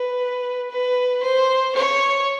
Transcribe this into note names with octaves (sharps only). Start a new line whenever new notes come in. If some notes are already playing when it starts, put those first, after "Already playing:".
Already playing: B4
B4
C5
C#5